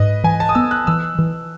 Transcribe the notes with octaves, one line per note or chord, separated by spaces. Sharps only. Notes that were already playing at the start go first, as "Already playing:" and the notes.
Already playing: G#2 B4 D#5
E3 G#5
A5
D#6
B3 E6
F#6
E3 E6
E3